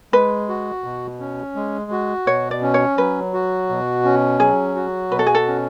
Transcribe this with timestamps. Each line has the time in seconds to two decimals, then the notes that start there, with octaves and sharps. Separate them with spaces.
0.13 G#3 B4
0.49 F#4
0.84 B2
1.20 C#4
1.56 G#3
1.91 F#4
2.27 B2 C#5
2.51 D5
2.62 C#4
2.74 C#5
2.98 F#3 B4
3.34 F#4
3.69 B2
4.05 C#4
4.40 F#3 G#4
4.75 F#4
5.11 B2 B4
5.19 A4
5.27 G#4
5.35 A4
5.47 C#4